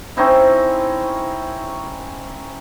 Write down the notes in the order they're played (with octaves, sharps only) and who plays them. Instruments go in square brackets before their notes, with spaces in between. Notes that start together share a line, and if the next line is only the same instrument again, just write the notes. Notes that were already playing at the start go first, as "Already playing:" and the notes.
[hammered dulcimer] C4 C#4 D#4 E4